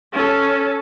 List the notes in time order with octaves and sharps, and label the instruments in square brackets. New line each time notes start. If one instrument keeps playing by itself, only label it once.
[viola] C#4 A4